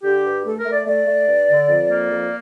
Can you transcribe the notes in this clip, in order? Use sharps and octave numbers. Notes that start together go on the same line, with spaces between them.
D3 G4
G2
A3 A4
A#4
A3
D5
A3 D5
A3
G2
D3
F2
A#3
F2